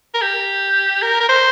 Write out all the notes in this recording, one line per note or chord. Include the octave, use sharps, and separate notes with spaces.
A#4
G4
A#4
A#4
C5